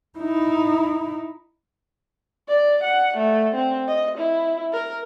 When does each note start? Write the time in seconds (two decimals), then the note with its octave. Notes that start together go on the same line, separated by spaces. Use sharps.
0.19 D#4 E4
2.49 D5
2.83 F#5
3.17 A3
3.55 C4
3.88 D#5
4.18 E4
4.73 A#4